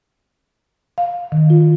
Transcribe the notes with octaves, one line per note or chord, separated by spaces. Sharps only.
F5
D#3
F4